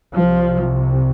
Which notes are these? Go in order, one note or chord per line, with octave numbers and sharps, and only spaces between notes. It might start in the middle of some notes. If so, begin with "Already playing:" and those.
C2 C3 F3